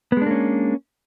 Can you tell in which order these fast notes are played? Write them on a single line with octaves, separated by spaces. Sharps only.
B3 G#3 D4 A#3 C#4